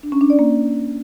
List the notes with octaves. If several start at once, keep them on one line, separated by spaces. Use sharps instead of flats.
D4
C#4
D4
D5
A#3